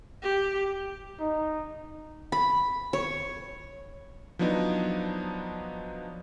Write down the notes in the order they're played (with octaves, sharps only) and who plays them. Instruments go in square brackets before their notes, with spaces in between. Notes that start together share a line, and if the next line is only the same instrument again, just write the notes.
[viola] G4
[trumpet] D#4
[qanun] B5
C#5
[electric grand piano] F3 F#3 B3 D4 D#4